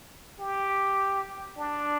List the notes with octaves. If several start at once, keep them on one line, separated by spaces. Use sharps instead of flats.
G4
D4